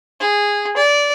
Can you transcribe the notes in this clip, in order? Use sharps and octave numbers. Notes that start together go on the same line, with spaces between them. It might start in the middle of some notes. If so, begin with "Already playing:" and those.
G#4
D5